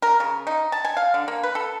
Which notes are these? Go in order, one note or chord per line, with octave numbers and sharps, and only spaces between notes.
A#4
C#3
D#4
A5
G#5
F5
D3
A#3
B4
A4